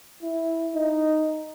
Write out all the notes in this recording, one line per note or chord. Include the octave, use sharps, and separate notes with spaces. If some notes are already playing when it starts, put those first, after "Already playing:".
E4
D#4